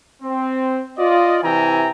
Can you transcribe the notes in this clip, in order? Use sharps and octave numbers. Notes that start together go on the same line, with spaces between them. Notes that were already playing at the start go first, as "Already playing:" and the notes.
C4
F4 D5 D#5
C3 E3 E5 G5 G#5 A#5